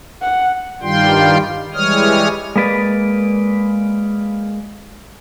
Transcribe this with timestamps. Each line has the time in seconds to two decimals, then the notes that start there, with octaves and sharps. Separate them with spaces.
0.22 F#5
0.82 G2 D#3 G3 F4 G5 C6
1.74 E3 G3 G#3 C#5 D#6 F6
2.56 G#3 A#3 B4 D5